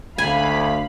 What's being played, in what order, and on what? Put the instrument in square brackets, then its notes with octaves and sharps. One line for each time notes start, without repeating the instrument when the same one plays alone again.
[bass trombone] D2 [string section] F5 B5 [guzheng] G#5